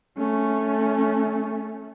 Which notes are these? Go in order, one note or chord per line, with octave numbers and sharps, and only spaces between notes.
A3 C#4